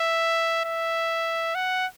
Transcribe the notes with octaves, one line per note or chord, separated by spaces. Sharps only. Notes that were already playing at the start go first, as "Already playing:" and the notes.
Already playing: E5
E5
F#5